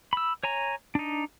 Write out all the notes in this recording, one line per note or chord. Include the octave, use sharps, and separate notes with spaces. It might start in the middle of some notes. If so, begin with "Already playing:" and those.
B5 E6
C#5 G#5 A#5
D4 D#4